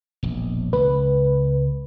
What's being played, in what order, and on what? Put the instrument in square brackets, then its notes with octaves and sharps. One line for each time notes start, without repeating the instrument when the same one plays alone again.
[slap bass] E1 A#1
[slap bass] C#2 [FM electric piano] B4